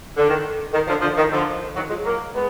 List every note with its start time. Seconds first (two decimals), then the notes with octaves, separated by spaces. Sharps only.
0.17 D3
0.28 D#3
0.72 D#3
0.87 D3 F3
1.01 D3 F3
1.17 D#3
1.31 D3 F3
1.75 D#3 F#3
1.89 F3 G#3
2.04 F#3 A#3
2.33 G#3 B3